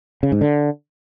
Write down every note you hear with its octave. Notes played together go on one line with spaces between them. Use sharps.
C#3
G#2
D3